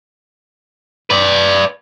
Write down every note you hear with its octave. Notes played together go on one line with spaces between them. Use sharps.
B4 D5